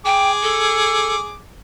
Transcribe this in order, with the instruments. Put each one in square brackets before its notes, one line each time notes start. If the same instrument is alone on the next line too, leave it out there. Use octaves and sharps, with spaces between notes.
[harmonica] G#4 D6 [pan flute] G5
[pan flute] A4